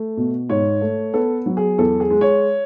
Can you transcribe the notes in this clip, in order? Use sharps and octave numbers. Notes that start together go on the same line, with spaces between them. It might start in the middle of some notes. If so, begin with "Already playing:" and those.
Already playing: A3
B2
G#2 C#5
A3
B3 A4
F#3
G#4
E2 A4
G#4
G#3
C#5